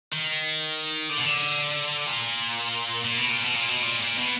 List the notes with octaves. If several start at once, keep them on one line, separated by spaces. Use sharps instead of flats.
D#3
D3
B2
D3
A#2
A#2
B2
A#2
B2
A#2
B2
A#2
A#2
B2